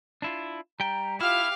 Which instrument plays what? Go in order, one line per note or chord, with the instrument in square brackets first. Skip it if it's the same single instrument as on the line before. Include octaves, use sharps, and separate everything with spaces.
[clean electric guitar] D4 E4 F4
[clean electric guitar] G3 G5 [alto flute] A#5
[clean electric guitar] E4 [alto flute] F4 [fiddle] G4 F5 [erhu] F6